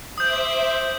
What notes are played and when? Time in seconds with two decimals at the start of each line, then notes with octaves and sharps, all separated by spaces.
0.18 C5 E5 D6 D#6 G6